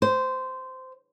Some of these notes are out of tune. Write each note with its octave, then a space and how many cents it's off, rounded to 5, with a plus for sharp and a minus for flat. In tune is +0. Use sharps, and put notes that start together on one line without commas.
C5 -15